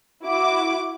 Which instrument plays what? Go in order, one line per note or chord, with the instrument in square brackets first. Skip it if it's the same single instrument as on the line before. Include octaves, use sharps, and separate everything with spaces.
[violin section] E4 F#4 D6